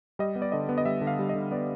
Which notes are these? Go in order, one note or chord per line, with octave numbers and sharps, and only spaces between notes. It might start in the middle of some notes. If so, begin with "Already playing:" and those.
G3 D#5
B3
D5
D3 D#5
B3
D#5
G3 E5
D3
F5
G3
D#5
D3
B3 D5